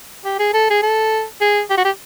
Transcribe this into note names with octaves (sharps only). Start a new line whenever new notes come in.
G4
G#4
A4
G#4
A4
G#4
G4
F#4
G4